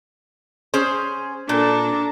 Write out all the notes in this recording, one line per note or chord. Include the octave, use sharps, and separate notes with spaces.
C#4 G#4 C5
A#2 D4 A4 A#5